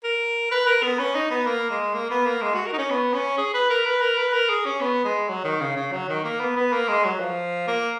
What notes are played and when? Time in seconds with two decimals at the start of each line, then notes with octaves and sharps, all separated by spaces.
0.04 A#4
0.51 B4
0.67 A#4
0.83 B3
0.99 C#4
1.15 D#4
1.31 B3
1.47 A#3
1.71 G#3
1.94 A#3
2.11 B3
2.26 A#3
2.42 G#3
2.55 F#4
2.66 A#4
2.73 D#4
2.78 C#4
2.90 B3
3.14 C#4
3.38 G#4
3.54 B4
3.70 A#4
3.86 B4
4.01 A#4
4.18 B4
4.33 A#4
4.49 G#4
4.66 C#4
4.81 B3
5.05 G#3
5.29 F#3
5.44 D#3
5.61 C#3
5.77 C#3
5.92 F#3
6.09 D#3
6.24 A#3
6.40 B3
6.56 B3
6.73 A#3
6.88 G#3
7.04 F#3
7.20 F3
7.67 A#3